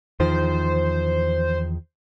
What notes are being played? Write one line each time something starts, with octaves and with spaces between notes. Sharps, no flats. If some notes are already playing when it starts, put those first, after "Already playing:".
E2 D#3 F3 C5